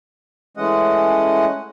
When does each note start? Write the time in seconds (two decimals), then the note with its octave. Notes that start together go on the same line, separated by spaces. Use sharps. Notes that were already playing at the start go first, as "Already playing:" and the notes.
0.57 E3 G#3 A3 C#4 D#5 F#5